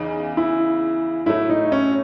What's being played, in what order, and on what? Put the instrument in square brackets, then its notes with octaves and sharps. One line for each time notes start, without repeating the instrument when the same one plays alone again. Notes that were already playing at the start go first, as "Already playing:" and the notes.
Already playing: [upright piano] E2 C#3 E3 [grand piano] D#4
[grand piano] E4
[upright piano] A2 F#3 A3 [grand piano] E4
[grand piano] D#4
C#4